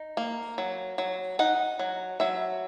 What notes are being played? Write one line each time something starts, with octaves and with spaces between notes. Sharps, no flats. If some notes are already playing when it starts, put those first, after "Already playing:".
Already playing: D#4
A#3
F#3
F#3
D#4 F#5
F#3
F#3 E5